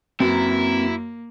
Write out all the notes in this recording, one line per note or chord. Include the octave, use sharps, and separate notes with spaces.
F#2 A#3 C4 E4 B4 A#5